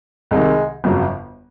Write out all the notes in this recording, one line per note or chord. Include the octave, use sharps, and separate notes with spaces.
C2 C3 D#3 G#3
G1 F2 C#3 F#3